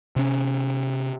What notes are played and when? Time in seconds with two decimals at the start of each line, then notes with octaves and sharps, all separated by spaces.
0.16 C3 C#4